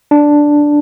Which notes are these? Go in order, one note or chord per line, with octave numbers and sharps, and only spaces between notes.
D4